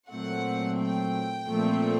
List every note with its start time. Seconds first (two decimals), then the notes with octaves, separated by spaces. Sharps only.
0.11 A#2 F#3 A3 C4 F#5
0.79 G5
1.47 A#2 F3 A3 C4